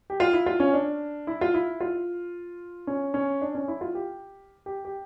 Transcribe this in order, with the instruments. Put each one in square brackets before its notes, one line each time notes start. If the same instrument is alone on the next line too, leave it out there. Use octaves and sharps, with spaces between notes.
[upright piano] G4
F4
E4
F4
C#4
D4
E4
F4
E4
F4
C#4
C#4
D4
C#4
E4
F4
G4
G4
G4